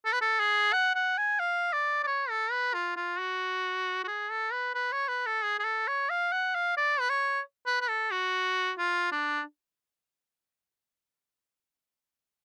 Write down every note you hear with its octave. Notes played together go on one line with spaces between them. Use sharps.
A4
B4
A4
G#4
F#5
F#5
G#5
F5
D5
D5
C#5
A4
B4
F4
F4
F#4
F#4
G#4
A4
B4
B4
C#5
B4
A4
G#4
G#4
A4
C#5
F5
F#5
F5
D5
B4
C#5
B4
B4
A4
F#4
F4
D4